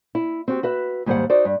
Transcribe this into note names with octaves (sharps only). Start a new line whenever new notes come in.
E4
C4 F#4 G4
F#4 B4 E5
D#2 G#2 G3 G#3 C5 F#5
D#4 F#4 C5 D5
G2